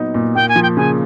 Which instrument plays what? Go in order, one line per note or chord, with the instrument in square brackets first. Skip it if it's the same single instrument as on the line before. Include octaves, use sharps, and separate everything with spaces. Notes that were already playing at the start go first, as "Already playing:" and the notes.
Already playing: [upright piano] A#2 F#3 B3 D#4
A#2
[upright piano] A#3 [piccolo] G5
[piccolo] G#5
[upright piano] F3
[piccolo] G5
[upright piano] C#3 [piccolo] G#5